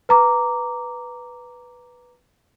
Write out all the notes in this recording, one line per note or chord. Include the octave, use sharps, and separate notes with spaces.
B4 A#5 D6